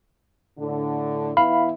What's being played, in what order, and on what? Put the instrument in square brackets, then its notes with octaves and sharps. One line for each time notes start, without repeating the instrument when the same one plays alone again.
[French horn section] A2 D3
[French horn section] E3 B3 E4 [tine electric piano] F5 B5